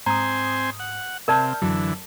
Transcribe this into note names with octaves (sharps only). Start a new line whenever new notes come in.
G#2 C4 C5 G#5 A#5 D#6
F#5
C3 A#4 D5 E5 A5 F6 G6
F#2 D3 E3 F#3